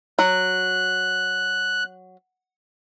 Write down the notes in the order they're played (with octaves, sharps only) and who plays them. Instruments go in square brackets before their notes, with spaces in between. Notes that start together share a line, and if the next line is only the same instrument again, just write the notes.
[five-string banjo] F#3 [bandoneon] F#6